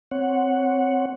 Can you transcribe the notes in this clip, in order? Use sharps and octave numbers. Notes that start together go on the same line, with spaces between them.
C4 C#5 F#5